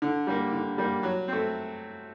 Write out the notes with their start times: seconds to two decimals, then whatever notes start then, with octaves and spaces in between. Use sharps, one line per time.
0.02 D3
0.27 G3 A#3
0.53 D3
0.78 G3 A#3
1.03 F#3
1.28 A3 C4